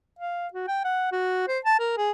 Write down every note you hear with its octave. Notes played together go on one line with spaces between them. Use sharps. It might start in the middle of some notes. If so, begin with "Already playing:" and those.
F5
F#4
G5
F#5
F#4
C5
A5
A#4
G#4